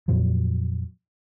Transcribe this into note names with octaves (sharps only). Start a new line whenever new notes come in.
F2 A#2 F3 F#3